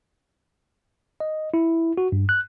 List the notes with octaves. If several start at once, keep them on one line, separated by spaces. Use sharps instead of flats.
D#5
E4
F#4
G2
F#6